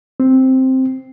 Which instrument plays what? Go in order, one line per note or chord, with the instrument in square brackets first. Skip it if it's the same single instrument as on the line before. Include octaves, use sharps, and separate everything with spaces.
[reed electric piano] C4